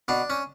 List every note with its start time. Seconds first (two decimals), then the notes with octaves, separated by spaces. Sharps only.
0.08 B2 D4
0.30 C#4